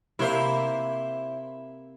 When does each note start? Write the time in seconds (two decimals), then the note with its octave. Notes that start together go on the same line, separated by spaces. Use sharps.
0.19 C3 A#3 E4 C5